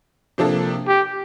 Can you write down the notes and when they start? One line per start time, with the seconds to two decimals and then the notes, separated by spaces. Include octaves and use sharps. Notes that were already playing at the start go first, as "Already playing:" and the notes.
0.38 C3 F3 A#3 D4 A4
0.88 G4